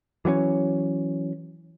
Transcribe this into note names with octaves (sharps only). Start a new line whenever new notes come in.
E3 F#3 B3 C#4